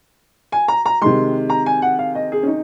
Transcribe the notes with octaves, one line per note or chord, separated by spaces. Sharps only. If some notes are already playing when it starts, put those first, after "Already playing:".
G#5
A#5
A#5
C3 D#3 G#3 C6
A#5
G#5
F#5
F5
D#5
G#4
C#4
D#4